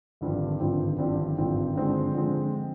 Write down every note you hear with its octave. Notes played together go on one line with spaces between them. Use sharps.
G#1 G2 D3 F3 C4
G#1 G2 D3 F3 C4
G#1 G2 D3 F3 C4
G#1 G2 D3 F3 C4
D3 F3 G#3 C4
D3 F3 G#3 C4